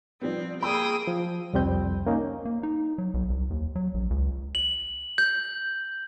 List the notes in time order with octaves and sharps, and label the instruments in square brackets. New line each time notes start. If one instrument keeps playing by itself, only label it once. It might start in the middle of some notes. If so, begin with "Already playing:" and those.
[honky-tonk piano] F3 G3 B3 [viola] C4
[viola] A#3 G#4 [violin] G5 D#6 [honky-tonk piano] B5 E6
[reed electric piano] F3
C2 F2 G3 C4 G6
A#3 C#4 D#4
[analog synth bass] A#3
D#4
F#3
B1
C2
D#2
F#3
A#1
C#2
[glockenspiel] F#7
G6